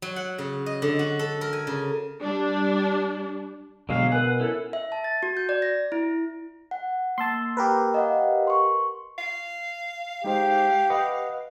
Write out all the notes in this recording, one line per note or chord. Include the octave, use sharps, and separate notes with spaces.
F#3
F#5
C#3
D#5
D3
F#4
A4
A#4
G#5
C#3
G3 D4
B2 D3 F#3 G#3 F5
A#4 B4 F#5 G#5
C#4 E4 A4
E5
A5
A6
F#4
G6
D5
A#6
E4
F#5
A#3 A5 C6 E6
G4 A#4 B4
D#5 F5 F#5
C6 C#6
F5
G#3 D#4 G4 C5
B4 D#5 F#5